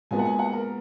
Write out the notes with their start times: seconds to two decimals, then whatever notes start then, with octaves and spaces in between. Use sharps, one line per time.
0.11 A#2 G#3 B3 G#5
0.19 F#5
0.25 G#5
0.39 F#5
0.53 A#4